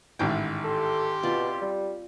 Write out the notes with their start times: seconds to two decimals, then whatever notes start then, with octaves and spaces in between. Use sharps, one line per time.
0.19 A1 G#2 D#3 G#3 E4 G5
0.65 G4 A4 C6
1.23 B2 C4 F4 D5
1.62 G3